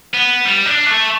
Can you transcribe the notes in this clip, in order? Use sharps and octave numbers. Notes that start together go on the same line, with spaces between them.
B3
G3
D4
A3